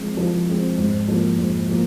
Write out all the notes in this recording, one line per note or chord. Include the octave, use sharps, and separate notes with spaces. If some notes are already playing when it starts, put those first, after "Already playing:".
Already playing: F3 G#3 C4
F3
G#3 C4
G#2
F3 A#3
G#2
F3 A#3